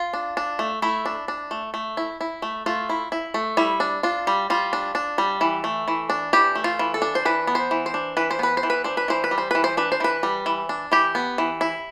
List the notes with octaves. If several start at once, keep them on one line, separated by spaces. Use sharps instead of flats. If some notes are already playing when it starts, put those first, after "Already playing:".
Already playing: F4
D4
D4
A3
A3 E4
D4
D4
A3
A3
E4
E4
A3
A3 F4
E4
E4
A3
G3 E4
D4
D4 F4
G3
G3 F4
D4
D4
G3
E3
A3
E3
D4
E3 G4
A3
F4
E3
A4
D4
C5
E3 B4
B3
C5
E3
C5
D4
E3 B4
C5
B3 B4
C5
E3
B4
D4 C5
B4
E3 C5
B4
G3
C5
E3 B4
C5
D4 B4
C5
E3 B4
G3
E3
D4
E3 G4
B3
E3
E4